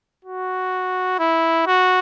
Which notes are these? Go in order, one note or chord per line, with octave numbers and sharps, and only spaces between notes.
F#4
E4
F#4